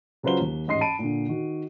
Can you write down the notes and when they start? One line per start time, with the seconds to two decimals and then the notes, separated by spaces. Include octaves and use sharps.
0.23 C#3 F#3 F4 B4 C5 G7
0.40 D#2
0.68 A1 G#2 D#5 C6 C7
0.81 A5 B5 D7 D#7
0.99 A#2 D3
1.28 D#3 F#4